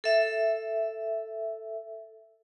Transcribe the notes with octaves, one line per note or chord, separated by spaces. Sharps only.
A4 E5